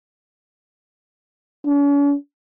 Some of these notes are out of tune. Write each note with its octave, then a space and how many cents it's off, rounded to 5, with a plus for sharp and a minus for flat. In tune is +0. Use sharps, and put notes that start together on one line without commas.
C#4 +45